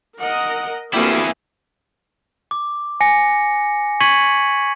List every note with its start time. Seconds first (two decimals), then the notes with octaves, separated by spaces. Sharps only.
0.20 A#4 D#5 F#5
0.93 D2 E3 G3 A#3 C4 E4 G4 G#4
2.51 D6
3.01 G#5 A#6 C#7
4.01 C#6 G#6 B6 C#7 D#7 F#7